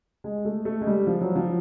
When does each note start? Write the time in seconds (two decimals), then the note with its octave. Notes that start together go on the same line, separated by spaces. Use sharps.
0.24 G#3
0.45 A3
0.65 A3
0.81 G#3
0.87 G3
1.07 F3
1.21 F#3
1.36 F3